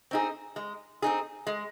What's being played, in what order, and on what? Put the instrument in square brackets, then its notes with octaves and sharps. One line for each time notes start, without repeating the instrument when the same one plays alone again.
[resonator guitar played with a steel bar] C4 D#4 G#4
G#3
C4 D#4 G#4
G#3